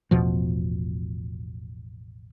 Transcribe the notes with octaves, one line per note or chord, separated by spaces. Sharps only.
A1 E2 B2 F3